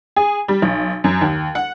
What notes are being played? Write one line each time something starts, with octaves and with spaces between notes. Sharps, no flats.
G#4
G3
B1
F#2
D#2
F#5